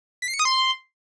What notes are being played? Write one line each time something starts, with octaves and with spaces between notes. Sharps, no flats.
B6
C7
C#7
D#6
C6